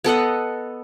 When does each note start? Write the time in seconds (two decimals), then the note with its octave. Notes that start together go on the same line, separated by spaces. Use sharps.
0.04 B3 A4 D#5 F#5